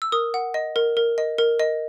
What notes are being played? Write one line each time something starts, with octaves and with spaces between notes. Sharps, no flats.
E6
A#4 D#6
F#5
D#5
A#4
A#4
D#5
A#4
D#5